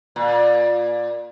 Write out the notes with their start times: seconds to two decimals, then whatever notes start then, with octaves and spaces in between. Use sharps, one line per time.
0.16 A#2